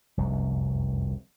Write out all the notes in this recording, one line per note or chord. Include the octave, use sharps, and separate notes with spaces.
F1 C2 F#2